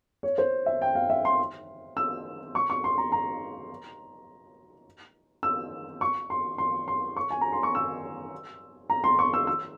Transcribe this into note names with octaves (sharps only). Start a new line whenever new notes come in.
C#5
C5
E5
G5
F5
E5
C6
E6
C#6
C#6
C6
A#5
A#5
E6
C#6
C6
C6
C6
C#6
G#5
A#5
C6
C#6
E6
A#5
C6
C#6
E6
E6